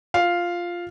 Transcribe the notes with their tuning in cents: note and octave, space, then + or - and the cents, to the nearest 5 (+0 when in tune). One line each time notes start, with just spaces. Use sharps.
F4 +0 F5 +0